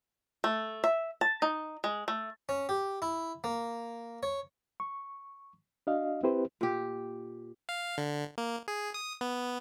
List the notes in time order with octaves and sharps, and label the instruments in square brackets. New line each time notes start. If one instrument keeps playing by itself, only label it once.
[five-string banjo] A3
E5
A5
D#4
G#3
A3
[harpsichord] C#4
G4
E4
A#3
C#5
[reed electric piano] C#6
D4 F#4 D#5 F5
C4 E4 G4 B4 C5
[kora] A#2 G4
[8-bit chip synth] F5
D3
A#3
G#4
D#6
B3